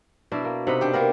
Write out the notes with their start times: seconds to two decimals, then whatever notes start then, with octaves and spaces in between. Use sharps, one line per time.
0.32 B2 D4 E4
0.45 A#3
0.67 C3 D#4 F#5 B5
0.81 D4 G4
0.93 A#3 B3 A#4